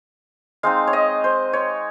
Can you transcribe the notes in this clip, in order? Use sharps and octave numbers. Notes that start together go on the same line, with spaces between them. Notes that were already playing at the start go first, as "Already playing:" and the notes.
G#3 C4 D#4 F5
C#5
D#5
C5
C#5